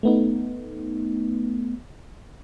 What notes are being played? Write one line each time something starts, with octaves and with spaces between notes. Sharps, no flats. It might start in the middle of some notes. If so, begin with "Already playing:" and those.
A3 B3 D#4